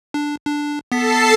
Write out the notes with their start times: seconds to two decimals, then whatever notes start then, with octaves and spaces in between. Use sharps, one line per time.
0.14 D4
0.46 D4
0.92 B3 A4 A5 B6 C7